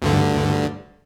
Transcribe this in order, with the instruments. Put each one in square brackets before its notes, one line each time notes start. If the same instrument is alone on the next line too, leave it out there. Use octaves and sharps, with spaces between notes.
[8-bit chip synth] D2 G2 D3